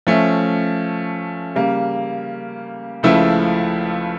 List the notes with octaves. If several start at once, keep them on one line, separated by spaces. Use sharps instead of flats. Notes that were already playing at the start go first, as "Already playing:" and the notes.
F3 A3 C#4
C#3 G3 A#3
C#2 C#3 F3 A3 E4